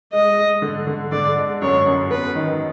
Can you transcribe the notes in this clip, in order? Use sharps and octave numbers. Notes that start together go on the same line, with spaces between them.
G#3 D#5
G#3
D3
D3
D3 D5
G#3
F#2 C#5
F#2
B3 B4
D#3